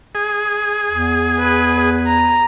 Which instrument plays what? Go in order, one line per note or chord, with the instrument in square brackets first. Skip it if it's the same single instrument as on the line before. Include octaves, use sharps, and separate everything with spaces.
[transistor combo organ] G#4
[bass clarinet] E2
[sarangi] B4
A#5